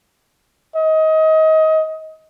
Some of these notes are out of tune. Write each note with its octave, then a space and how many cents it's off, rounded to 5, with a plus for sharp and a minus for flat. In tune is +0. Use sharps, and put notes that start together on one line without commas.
D#5 +25